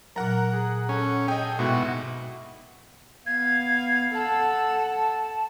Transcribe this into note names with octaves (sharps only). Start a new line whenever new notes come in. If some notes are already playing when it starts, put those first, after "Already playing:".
A#2 F#3 A#4 F#5 A#5
G#4
C#4 A4
G#4 D#5 G5
G#2 B2 E4 F#4
B3 F5 G#6
A4 F#5 A5